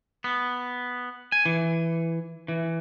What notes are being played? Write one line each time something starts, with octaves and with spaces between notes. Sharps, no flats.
B3
G#5
E3
E3